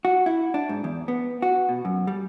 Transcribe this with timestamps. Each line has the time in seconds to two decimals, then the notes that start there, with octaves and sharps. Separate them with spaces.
0.05 F#4
0.26 E4
0.54 D4
0.69 G#2
0.84 E2
1.08 B3
1.42 F#4
1.69 B2
1.85 F#2
2.07 G3